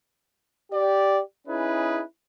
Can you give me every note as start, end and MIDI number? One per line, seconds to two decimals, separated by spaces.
0.72 1.21 67
0.72 1.21 74
1.47 2.02 61
1.47 2.02 63
1.47 2.02 64
1.47 2.02 68
1.47 2.02 71